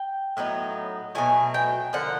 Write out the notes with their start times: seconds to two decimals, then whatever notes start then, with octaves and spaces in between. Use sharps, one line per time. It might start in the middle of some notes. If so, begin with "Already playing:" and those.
Already playing: G5
0.37 A2 F#3 B3 D#4
1.15 B2 F#3 A3 G#5
1.54 G5
1.93 D3 F3 A#3 F#5